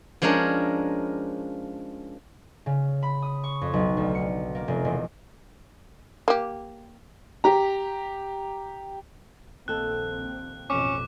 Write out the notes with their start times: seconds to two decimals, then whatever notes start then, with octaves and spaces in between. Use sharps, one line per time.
0.22 F3 G#3 C#4 D4 A#4
2.66 C#3
3.03 B5
3.22 D#6
3.44 C#6
3.61 F2
3.73 B1
3.97 D2
4.15 C#7
4.55 A#3
4.68 F1
4.85 E1
6.28 A#3 G4
7.44 G4 A#5
9.68 A#1 D#2 C4 A4 F#6
10.70 A1 F2 B2 C#4 D6